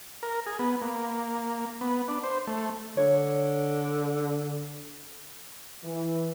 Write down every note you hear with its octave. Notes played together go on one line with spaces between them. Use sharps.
A#4
G#4
B3
A#3
B3
D4
C5
A3
D3 C#5
E3